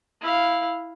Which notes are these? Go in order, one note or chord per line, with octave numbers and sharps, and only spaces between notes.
E4 F5